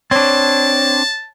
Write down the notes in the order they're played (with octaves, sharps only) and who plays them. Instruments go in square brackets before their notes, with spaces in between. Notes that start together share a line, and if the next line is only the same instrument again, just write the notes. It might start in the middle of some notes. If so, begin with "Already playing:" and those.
[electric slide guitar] C4 D4 [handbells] C#5 [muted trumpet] A5